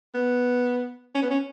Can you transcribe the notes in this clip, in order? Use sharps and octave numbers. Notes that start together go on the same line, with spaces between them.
B3
C#4
B3
C#4